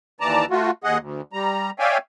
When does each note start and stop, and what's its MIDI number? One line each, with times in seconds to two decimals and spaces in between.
0.21 0.45 39
0.21 0.45 52
0.21 0.45 74
0.21 0.45 81
0.21 0.45 82
0.51 0.71 57
0.51 0.71 65
0.51 0.71 66
0.84 0.98 39
0.84 0.98 68
0.84 0.98 75
0.84 0.98 78
0.99 1.21 38
1.33 1.71 55
1.33 1.71 82
1.79 1.98 73
1.79 1.98 74
1.79 1.98 76
1.79 1.98 77
1.79 1.98 79
1.79 1.98 80